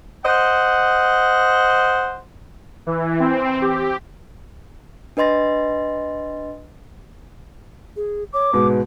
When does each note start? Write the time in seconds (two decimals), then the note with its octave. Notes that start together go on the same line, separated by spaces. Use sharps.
0.24 C5 D#5 F#5
2.87 E3
3.20 C4
3.62 G4
5.17 D4 B4 D#5 C6 A6 A#6
7.96 G#4
8.33 C#5 D6
8.53 G#2 B2 B4